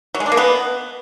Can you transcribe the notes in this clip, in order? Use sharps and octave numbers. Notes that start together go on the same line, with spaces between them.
F#3
G#3
D4
A#3
B3